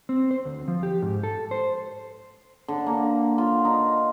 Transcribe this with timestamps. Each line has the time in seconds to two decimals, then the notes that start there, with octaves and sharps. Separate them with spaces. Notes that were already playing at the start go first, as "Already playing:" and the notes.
0.09 C4
0.31 C5
0.45 D2
0.68 F3
0.83 G4
1.02 G#2
1.23 A4
1.51 C5
2.68 D3
2.87 A#3
3.38 F4
3.65 D#4